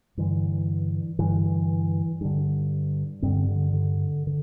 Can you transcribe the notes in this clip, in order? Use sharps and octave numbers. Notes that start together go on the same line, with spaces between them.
G2 D3 E3
G2 D3 E3
G2 D3
G2 D3 G3 C4
D3
D3
D3